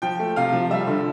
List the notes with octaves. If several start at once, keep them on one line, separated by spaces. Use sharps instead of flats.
F3 G5
A3
C3 F5
F3
G3 E5
D3